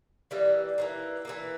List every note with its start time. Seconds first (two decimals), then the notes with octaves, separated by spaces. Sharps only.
0.31 E3 G3 A#3
0.78 E3 G3 A#3
1.25 E3 G3 A#3